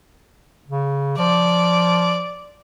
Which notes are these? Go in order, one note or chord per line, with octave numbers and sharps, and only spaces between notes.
C#3
F3 D5